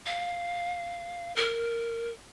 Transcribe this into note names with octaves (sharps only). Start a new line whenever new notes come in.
F5
A#4